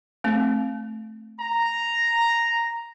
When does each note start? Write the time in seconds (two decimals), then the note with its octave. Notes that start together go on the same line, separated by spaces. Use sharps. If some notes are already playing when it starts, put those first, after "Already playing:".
0.24 A3 C4
1.40 A#5